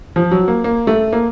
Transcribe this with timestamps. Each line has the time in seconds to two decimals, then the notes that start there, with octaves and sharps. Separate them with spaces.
0.16 F3
0.31 F#3
0.48 A#3
0.64 A#3
0.87 A3
1.13 A#3